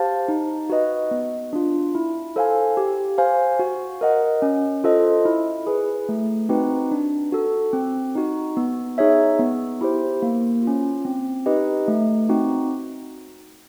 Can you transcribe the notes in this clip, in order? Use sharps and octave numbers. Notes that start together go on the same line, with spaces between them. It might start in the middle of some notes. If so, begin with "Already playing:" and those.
Already playing: G4 C5 F5 A5
D#4
F#4 B4 D#5
B3
D4 F4
E4
A4 C5 F5 G#5
G4
C5 F5 G#5
F#4
A#4 D#5 F#5
C#4
F4 A4 C5 D#5
E4
G#4 B4
A3
C4 D#4 F#4 B4
D4
F#4 A4
C4
D#4 F#4
B3
D#4 G#4 C#5 E5
B3
E4 G4 C5
A#3
C#4 F4
C4
D#4 G4 B4 D#5
A3
C4 D#4 F#4